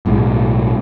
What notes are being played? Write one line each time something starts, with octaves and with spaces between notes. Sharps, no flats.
B1 A2 G#3